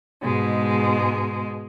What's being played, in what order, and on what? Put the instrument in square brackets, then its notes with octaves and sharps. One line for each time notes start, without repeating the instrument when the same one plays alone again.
[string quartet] G#2 B2 G#3